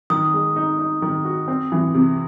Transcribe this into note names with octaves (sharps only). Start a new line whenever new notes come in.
D#3 D#6
G#3
D#4
D#4
D#3
F#4
C4
E3
C3